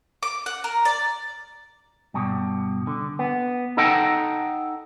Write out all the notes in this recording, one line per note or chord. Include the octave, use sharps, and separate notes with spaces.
D6
F#5
A#4
D5
G2 B2
D3
B3
D#4 A4 D#5 F#5 G5 A5